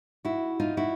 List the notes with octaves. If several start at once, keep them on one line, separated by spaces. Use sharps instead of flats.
E4 F#4
D#4 F4
E4 F#4